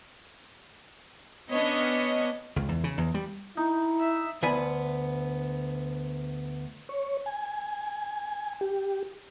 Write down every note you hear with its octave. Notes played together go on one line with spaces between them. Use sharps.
B3 C#4 D4 C#5 D#5
C#2
E2
C#3
E2
G3
D#4 E4
E5
D2 B3 E5 G#5 B5
C#5
G#5
G4